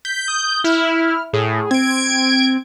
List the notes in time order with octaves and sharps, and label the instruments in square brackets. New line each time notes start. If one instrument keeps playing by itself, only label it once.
[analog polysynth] G6 [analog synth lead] B6
[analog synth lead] D#6
[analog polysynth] E4 [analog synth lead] F6
[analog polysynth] A2 [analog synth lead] G#4
[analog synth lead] C4 [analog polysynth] G#6 D7